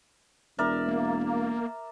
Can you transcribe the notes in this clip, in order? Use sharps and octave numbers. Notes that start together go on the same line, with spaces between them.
E1 A#4 D5 E5
A#3